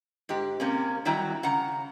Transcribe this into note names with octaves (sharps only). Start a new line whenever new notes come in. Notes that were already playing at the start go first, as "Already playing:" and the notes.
G#2 G4
C3 A#3 C#4
D#3 F#3 G3 E4 G5 A#5
C#3 F#5 A#5